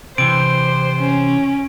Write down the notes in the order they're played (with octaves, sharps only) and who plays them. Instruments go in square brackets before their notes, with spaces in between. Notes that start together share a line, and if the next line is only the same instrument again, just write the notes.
[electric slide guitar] C3 E3 [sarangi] C5 [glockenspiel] D7
[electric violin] C#4